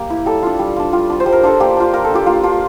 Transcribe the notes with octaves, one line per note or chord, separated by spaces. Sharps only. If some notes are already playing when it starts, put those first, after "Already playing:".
Already playing: A#3 G4
E4
G3 A4
D4 F4
G3
D4 F4
G3 F4
D4 F4
C5
G3
A#4
D4 F4 A4
A#3 G4
D4 F4
A#3 A#4
A4
D4 F4 G4
A#3 F4
D4 F4